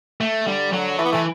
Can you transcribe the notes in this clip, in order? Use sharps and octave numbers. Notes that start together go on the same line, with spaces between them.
A3
D3 G3
D3 F#3
E3 A3
B3
E3 A3